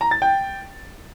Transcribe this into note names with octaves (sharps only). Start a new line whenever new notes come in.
A#5
A6
G5